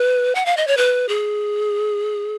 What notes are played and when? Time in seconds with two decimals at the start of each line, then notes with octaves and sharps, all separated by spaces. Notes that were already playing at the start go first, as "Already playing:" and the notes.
Already playing: B4
0.35 F#5
0.46 F5
0.57 D#5
0.67 C#5
0.77 B4
1.09 G#4